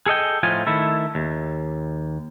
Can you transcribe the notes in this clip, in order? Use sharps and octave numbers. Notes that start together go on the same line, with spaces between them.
G#4 A4 D#5 G5
A2 F3 D#4 F4 G#5
D#3 A3 E4 A4
D#2